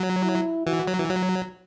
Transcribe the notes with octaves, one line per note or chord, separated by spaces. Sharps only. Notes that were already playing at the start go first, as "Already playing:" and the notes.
Already playing: F#3
E4
E3 F#4
F#3
E3
F#3